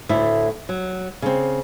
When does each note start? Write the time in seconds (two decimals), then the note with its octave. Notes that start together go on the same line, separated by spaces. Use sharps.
0.09 D2 A2 A3 E4
0.69 F#3
1.22 C#3 C4